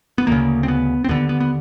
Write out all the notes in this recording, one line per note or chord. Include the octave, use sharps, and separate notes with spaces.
B3
D2 C#3 A#3
C4
B3
C4
D#2 D3 B3
B3
B3